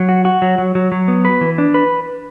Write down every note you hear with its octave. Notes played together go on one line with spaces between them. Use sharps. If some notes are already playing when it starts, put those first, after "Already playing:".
Already playing: F#3
F#4
F#4
F#3
F#3
F#3
F#3
B3
B4
E3
D4
B4